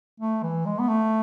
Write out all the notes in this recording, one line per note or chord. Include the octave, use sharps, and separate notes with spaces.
A3
E3
G#3
B3
A3